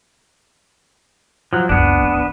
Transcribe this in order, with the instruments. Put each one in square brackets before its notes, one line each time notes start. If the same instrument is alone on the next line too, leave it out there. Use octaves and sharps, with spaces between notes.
[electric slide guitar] F3 F#3
[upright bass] F#1 C#2 [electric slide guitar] B3 D4
[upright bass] F1
E3